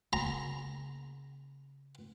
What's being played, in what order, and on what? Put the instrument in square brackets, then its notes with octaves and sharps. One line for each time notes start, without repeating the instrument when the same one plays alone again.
[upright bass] C#3 A#3 [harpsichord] A#5